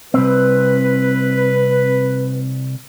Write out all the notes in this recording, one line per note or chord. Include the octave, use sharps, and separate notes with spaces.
C2 G#2 C4 B4